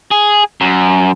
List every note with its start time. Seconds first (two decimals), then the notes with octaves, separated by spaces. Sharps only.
0.11 G#4
0.61 F#2